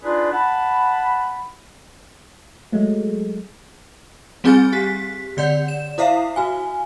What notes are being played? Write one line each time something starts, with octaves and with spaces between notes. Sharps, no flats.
D4 D#4 F4 G#4 B4 D5
F#5 A5 B5
F#3 G#3 A3
G3 C4 G#4 G#5 F6 A6
G4 B6
D3 D5 F#5 G6
E7
E4 C5 E5 F5 C7
F#4 G#5